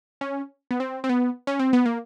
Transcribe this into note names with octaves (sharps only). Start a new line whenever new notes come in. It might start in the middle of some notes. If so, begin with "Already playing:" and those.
C#4
B3
C4
C4
B3
C#4
C4
B3
A#3